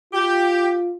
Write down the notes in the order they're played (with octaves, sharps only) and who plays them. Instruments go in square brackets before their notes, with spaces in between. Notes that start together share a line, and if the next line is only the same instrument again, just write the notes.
[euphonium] F4 [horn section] G4